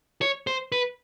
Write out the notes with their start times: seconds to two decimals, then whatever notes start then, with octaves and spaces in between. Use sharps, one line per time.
0.21 C#5
0.47 C5
0.72 B4